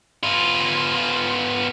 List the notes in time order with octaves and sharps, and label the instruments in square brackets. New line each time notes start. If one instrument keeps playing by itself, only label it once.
[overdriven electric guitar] B3 F4